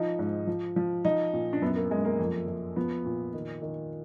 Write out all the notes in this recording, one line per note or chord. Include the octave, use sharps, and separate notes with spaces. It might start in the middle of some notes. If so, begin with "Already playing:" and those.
Already playing: F3 D#4
G#2
F3
F3
F3 D#4
A#2
D4
F#2 B3
A#3
F#2 G#3
A#3
F2
F2
F3 B3
A#2
D#3
D#3